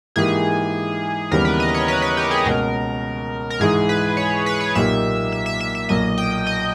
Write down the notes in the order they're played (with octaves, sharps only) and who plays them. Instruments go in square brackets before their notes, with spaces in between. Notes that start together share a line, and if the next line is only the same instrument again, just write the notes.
[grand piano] G#2 E3 A#3 D#4 G4 [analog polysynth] G#4
[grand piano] D#2 C#3 E3 G3 B3 [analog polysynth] A#4
[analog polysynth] B4
D#5
C#5
B4
B4
G4
G#4
[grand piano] C#2 B2 A#3 C#4 [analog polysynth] A#4
[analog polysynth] A#4
[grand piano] G#2 E3 G#3 [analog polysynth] G#4
[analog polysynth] B4
C#5
B4
C#5
[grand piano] B1 A#2 A#3 D#4 G4 [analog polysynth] E5
[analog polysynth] E5
E5
E5
E5
[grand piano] B1 A#2 A#3 [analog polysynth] D#5
[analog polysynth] G5
D#5